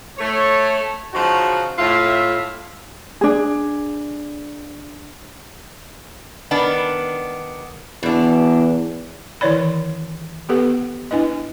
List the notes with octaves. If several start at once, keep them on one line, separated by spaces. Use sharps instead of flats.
A3 C#5
C#3 F3 D#4 F#4
A2 F4 E5
D4 G#4
D#3 B3 D4
E2 B2 D4
D#3 E3 E4 C#5 D5 B5
B3 G4 A4 B4 F#5
D4 E4 B4 D#5